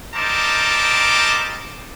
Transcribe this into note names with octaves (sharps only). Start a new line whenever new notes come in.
G3 C4 D#4 A#4 A5 D6